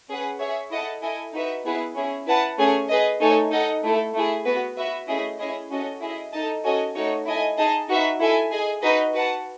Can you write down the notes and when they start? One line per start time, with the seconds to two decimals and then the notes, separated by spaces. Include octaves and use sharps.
0.08 C#4 G#4 B4 F#5
0.39 G#4 C#5 E5
0.71 E4 A4 D#5 F#5 A5
1.02 E4 A4 D#5 G#5
1.33 D#4 F#4 B4 E5
1.64 B3 E4 G#4 B4
1.95 C#4 E4 G#4
2.27 E4 B4 F#5 A5
2.58 A3 C#4 G#4 C#5 G#5
2.88 G#4 B4 D#5
3.20 A3 D#4 A4 C#5 G#5
3.51 D#4 A4 D#5 F#5
3.82 A3 E4 A4
4.14 A3 E4 G#4
4.45 B3 F#4 B4
4.77 F#4 B4 E5
5.08 A3 C#4 E4 G#4 D#5
5.39 C#4 E4 G#4 D#5
5.70 C#4 F#4 A4 D#5
6.01 E4 G#4 D#5
6.32 D#4 A4 D#5 A5
6.63 C#4 F#4 A4 D#5 G#5
6.95 A3 D#4 F#4 C#5
7.26 E4 A4 D#5 G#5
7.57 D#4 G#4 D#5 A5
7.88 D#4 F#4 B4 E5
8.19 E4 A4 E5 G#5
8.51 G#4 D#5 G#5
8.82 D#4 F#4 B4 D#5
9.13 F#4 B4 F#5 A5